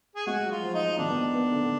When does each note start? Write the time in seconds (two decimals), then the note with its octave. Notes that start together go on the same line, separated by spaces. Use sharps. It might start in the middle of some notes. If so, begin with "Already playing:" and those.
0.16 G#4
0.27 G#3 F#4
0.46 F#3
0.52 F4
0.62 F3
0.74 D#4
0.81 F3
0.98 D#3 D4
1.10 B3
1.16 A#3
1.35 B3
1.52 D3